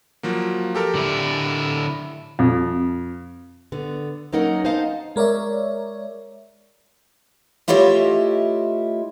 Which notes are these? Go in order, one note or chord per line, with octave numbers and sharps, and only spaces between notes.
F3 F#3 A#3
G4 A4 A#4
D3 E4
F2
D3 B3
F#3 A#3 C#4 D#4 A#4 F#5
D#4 C5 D#5 F5 A5
G#3 A#4 C#5 D5 E5
A3 E4 F4 G4 C#5 D#5